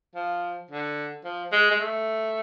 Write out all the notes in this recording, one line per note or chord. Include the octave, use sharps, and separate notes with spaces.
F3
D3
F3
G#3
G#3
A3